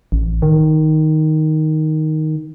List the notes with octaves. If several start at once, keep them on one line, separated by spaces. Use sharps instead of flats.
A1
D#3